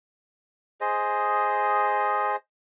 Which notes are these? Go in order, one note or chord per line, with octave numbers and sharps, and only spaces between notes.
G#4 C5 D#5